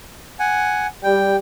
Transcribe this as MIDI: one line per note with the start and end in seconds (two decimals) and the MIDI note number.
0.39 0.87 78
0.39 0.87 80
1.03 1.35 55
1.03 1.36 79